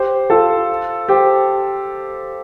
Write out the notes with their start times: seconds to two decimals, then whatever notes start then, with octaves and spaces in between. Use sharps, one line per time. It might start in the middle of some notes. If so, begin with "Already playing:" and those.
Already playing: G4 C5
0.30 F4 A4
1.09 G4 C5